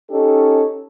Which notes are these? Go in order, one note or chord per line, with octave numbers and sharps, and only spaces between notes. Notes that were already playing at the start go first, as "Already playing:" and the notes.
C#4 D#4 G4 A4